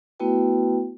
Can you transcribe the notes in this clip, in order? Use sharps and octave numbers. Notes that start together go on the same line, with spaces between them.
A3 B3 E4 F#4 B4 G5